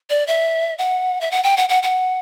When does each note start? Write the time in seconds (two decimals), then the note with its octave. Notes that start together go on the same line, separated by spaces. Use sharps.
0.10 D5
0.27 E5
0.78 F#5
1.21 E5
1.31 F#5
1.43 G5
1.57 F#5
1.69 F#5
1.83 F#5